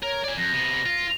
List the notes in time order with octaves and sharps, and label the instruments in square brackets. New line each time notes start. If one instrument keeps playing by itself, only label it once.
[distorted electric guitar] A#4 [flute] C#5
[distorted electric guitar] D5 G#5
[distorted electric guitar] F2 [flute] A#6
[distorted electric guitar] C3 B3
F4